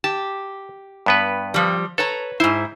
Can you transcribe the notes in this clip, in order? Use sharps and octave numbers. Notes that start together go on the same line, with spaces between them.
G4 A5
G2 B3 B4
F3 G3
A4 B4 C#5 A#5
G#2 E4 C5